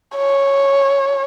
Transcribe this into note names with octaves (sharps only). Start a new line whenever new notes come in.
C#5